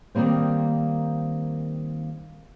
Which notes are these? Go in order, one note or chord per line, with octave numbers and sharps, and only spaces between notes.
D#3 F#3 G3 A#3 C4